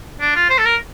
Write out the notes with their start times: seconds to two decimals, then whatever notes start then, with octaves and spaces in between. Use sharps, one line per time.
0.20 D4
0.35 F4
0.50 C5
0.58 A4
0.65 A#4